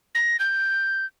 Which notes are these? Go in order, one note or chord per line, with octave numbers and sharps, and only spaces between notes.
A#6
G6